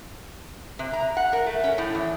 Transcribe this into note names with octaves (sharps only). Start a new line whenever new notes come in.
C3
A#5
F#5
A#4
A3
C#4
A2
E2